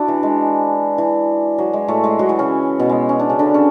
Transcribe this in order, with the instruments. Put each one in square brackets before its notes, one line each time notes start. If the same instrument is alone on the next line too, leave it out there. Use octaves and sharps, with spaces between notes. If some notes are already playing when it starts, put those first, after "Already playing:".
Already playing: [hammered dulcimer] D4 E4 F#4
E3
G#3
E3
F#3
G#3
A2 A3
G#3 G#4
F#3 F#4
E3 E4
C#3 C#4
B2 B3
G#3
C#4
D4
C#3 C#4
D3 D4
C#3 C#4